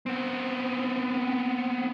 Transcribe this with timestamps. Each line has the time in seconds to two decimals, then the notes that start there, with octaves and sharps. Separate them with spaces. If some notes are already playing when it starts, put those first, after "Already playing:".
0.06 B3 C4